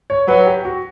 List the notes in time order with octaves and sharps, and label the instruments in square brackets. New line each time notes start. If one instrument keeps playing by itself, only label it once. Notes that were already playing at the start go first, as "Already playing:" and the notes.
[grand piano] C#5
[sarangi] F#3 [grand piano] B4
[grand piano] G4
F#4